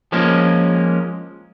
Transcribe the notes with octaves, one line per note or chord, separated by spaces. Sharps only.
F3 G#3 A#3 C#4